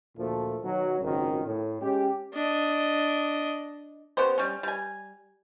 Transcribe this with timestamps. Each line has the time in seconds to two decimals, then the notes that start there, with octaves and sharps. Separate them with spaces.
0.17 D2 A#2 F3 A3
0.63 B2 D#3 F#3
1.00 G#1 C#2 F#2 D#3
1.45 A2
1.81 G#3 C#4 G4
2.34 D4 D#5
4.17 B3 C#4 G4 C5
4.38 G3 C#4
4.63 G3 G#5